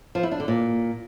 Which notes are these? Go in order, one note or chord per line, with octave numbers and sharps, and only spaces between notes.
F3
E4
D4
D3
A#2